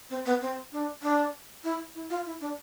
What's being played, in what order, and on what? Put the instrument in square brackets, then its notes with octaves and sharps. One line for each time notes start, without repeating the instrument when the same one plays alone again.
[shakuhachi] C4
B3
C4
D4
D4
E4
E4
F4
E4
D4